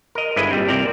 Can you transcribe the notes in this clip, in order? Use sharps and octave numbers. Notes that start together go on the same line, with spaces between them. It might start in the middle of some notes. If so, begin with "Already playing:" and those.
A#4 D#5
G1 D3 G#3 E4 B4 D#5
A#2 G3 C4
C2 C4 A#4 D5 A#5